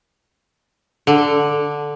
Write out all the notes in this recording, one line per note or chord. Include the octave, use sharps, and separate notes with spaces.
D3